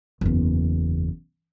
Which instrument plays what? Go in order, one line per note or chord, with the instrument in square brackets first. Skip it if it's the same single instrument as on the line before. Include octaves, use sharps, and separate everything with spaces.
[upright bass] F#1 E2